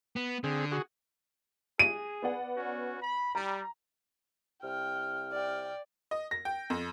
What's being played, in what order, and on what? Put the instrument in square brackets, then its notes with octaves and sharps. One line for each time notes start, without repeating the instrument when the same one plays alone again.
[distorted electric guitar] B3
[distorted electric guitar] D3 [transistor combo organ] C4 G#4
[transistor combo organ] F#4 G#4
[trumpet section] G#4 [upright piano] D#7
[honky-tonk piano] B3 D5 F#5
[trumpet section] C#4 F#4
B5
[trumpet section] G3 [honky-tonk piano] A#5
[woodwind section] C2 C3 F6 [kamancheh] G5
[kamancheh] D5 G5
[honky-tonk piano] D#5
A#6
G5
F2